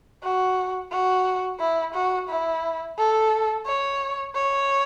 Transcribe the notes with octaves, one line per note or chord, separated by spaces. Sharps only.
F#4
F#4
E4
F#4
E4
A4
C#5
C#5